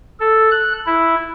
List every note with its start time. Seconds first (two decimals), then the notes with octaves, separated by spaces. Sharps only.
0.20 A4
0.51 F#6
0.86 E4